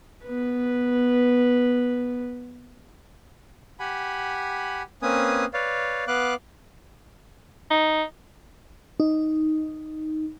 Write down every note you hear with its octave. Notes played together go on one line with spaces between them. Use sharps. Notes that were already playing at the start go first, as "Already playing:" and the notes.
B3 B4
G4 F#5 G#5 B5
A#3 C4 C#4 B4 G#5 D#6
B4 C#5 D5 F5
B3 B4 F5 D6 F#6
D#4
D#4